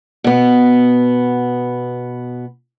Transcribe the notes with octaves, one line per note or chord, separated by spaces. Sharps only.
B2 B3